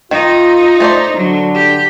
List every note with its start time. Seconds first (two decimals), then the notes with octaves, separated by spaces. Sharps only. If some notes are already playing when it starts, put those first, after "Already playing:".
0.11 D#3 D#4 F4
0.80 A3 C5 D5
1.17 D3 F#3 D4
1.55 G4